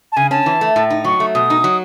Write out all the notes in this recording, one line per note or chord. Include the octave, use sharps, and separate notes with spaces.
A5
C#3 G#5
C#4 A5
E3
A3
A2
D#4
F#3 C#6
A3
B2 D#6
D#4
F#3